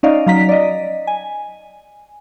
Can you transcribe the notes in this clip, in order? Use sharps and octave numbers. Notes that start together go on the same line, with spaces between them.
C#4 D#4 D5 D#5 F5
F#3 F5 A#5 B6
D5 D#5
G#5